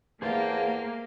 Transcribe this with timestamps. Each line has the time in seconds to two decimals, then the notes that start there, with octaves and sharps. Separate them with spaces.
0.22 E2 A#3 G4 G#4 C5 F5 A5